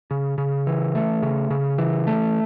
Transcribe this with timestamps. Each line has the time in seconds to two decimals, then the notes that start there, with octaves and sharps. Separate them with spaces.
0.11 C#3
0.38 C#3
0.67 E3
0.95 A3
1.23 C#3
1.50 C#3
1.78 E3
2.07 A3